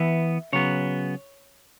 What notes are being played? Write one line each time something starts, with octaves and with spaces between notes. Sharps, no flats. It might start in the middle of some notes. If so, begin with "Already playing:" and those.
Already playing: E3 B3 E5
C#3 F#3 B3 C#5